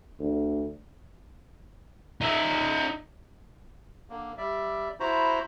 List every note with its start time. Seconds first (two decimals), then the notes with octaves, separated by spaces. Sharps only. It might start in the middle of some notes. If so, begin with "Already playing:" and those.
0.19 D2
2.21 D#4 E5
4.10 D3 A#3
4.38 G3 D5 E5
5.00 E4 F#4 C5 A#5 B5